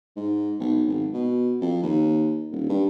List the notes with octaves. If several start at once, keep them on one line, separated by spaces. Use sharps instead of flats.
G#2
B1
G#1
B2
F2
D#2
D#1
G2